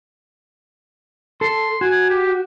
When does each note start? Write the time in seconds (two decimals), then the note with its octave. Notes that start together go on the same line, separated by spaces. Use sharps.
1.41 A4 C6
1.81 F#4 G#5
2.10 G4